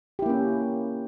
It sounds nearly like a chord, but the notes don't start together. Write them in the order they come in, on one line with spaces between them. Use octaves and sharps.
G4 E4 A#3 C#4